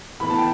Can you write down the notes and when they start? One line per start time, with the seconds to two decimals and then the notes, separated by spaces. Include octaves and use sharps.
0.20 A2 E3 B3 B5
0.30 A5
0.38 G5